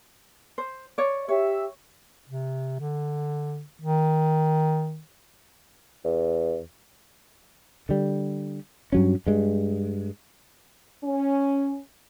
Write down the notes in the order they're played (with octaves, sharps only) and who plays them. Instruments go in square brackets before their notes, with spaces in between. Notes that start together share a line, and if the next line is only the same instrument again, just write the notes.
[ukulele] C5
C#5 D5
[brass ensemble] G4 E5 [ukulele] C#5
[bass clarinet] C3
D3
D#3
[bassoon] E2
[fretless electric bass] D3 G3
G2 F#3 C#4
G2 G#3
[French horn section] C#4